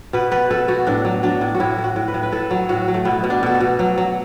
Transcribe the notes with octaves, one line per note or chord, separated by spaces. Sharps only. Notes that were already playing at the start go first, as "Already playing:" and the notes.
B2 B4
B2 B4
B2 A4
B2 F#4
A2 D4
F#3
F#3 D4
A2
F#4
A2 E4
A2
F#4
A2
B4
A2
B4
A2 A4
F#3
A2 F#4
F#3
A3
B2 B3
B2
D4
B2 A4
F#4
B2
F#3
F#3